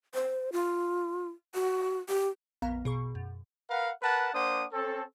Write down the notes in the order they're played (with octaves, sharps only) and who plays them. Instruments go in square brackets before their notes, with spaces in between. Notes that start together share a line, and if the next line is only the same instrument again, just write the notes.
[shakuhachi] C5
F4
F#4
G4
[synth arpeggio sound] A#1 F2 B3 F5 A#5
B2 G#4 C#6
F#2
[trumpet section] A#4 B4 F5 F#5
A#4 B4 F#5 A5
A#3 D4 C5 F#5 D#6
C4 C#4 A4